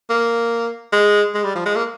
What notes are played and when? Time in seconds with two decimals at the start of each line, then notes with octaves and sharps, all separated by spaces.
0.10 A#3
0.92 G#3
1.35 G#3
1.44 G3
1.55 F3
1.66 G#3
1.76 A#3